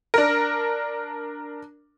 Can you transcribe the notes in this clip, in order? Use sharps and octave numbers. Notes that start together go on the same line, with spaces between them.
D4 A#4